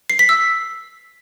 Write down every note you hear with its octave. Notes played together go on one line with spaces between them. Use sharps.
C7
B6
E6